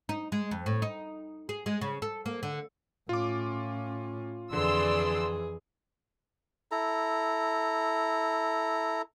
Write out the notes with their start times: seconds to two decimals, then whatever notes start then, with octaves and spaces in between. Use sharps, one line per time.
0.09 D#4
0.32 G#3
0.51 F2
0.66 A2
0.82 D#4
1.49 G#4
1.66 G#3
1.81 C#3
2.02 A4
2.26 A#3
2.43 D3
3.09 A2 C#4 F4 D6
4.53 F2 D3 E3 G#4 D5 C6 E6
6.71 E4 A4 A#5